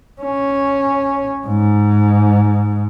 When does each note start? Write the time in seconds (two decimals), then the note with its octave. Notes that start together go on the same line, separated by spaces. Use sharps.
0.21 C#4
1.47 G#2